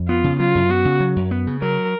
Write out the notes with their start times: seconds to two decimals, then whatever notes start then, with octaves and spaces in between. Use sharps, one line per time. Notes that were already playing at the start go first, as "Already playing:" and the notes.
Already playing: F2
0.08 B3 F4
0.24 C#3
0.39 F#3 F4
0.55 F#2
0.69 B3 F#4
0.85 C#3
1.00 F#3
1.16 F#2
1.31 B3
1.47 C#3
1.62 F#3 A#4